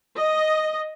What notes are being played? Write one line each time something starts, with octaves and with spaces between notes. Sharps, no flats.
D#5